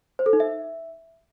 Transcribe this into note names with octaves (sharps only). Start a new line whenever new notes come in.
C5
A4
D#4
E5